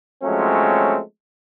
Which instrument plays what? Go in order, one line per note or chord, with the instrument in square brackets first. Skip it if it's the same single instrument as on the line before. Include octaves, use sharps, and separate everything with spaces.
[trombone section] F3 F#3 G#3 A3 C4 C#4